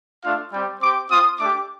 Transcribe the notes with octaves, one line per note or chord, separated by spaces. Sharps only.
A3 D4 F4 F5
G3 C4 G4 G5
C4 G4 D6
C4 F4 D#6
A3 D4 G4 D6